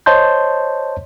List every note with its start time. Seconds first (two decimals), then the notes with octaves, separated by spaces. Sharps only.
0.06 C5 C#5 D#5 A5 C6 G6